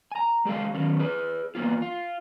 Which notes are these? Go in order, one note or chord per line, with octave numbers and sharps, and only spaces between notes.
G#5 A#5
G#3 G4 A4 F5
D#3 F#3 C#4
G#4 B4
E2 A#3 B3 F4
F4